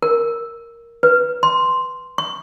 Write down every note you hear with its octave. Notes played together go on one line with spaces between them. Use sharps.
A#4
B4
C6
C#6